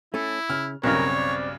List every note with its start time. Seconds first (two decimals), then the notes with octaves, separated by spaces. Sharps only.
0.14 A3 C#4 E4 A4
0.50 C#3 F6
0.83 B1 G2 C#3 C4 A#4 C#5
1.15 D5